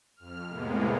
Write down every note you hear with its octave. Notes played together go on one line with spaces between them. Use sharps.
F2 F6
A2 C3 G#3 A#3 B3